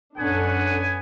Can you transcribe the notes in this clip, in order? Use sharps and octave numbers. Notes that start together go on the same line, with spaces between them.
F#2 B3 C#4 D4 A4 F#5 G#5